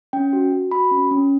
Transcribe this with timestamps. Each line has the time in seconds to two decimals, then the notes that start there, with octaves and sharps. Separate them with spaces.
0.13 C#4 G5
0.33 F#4
0.52 F#4
0.71 F#4 B5
0.91 C#4
1.11 C#4